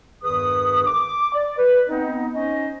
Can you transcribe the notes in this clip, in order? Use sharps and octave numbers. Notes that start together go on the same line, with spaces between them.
E2 G2 D#3 G#4 B4 D#6
D6
D5
B4
B3 C4 D#4
C#4 D#4 C5 D#5